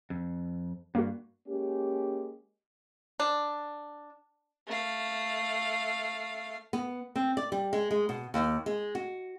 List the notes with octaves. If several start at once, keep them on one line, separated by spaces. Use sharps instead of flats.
F2
G2 A#3 F#4
G#3 A#3 C#4 G4
D4
A3 F5
B3
C4
D5
G3
G#3
G#3
B2
D#2
G#3
F#4